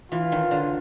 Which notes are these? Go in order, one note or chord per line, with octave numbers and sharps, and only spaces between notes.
E3 F4
D#3
D3